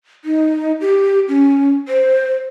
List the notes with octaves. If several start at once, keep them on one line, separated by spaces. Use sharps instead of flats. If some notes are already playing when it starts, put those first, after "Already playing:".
D#4
G4
C#4
C5